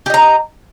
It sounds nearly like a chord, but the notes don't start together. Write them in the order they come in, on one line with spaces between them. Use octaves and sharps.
G4 D#5 A#5